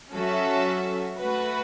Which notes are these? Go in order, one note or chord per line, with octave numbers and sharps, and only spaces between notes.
F#3 C#4 F#4 A4 E5
A3 F#4 B4